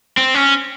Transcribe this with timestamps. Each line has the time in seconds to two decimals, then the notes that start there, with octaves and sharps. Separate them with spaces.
0.17 C4
0.35 C#4